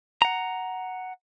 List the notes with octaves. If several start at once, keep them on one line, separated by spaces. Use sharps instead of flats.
F#5 A#5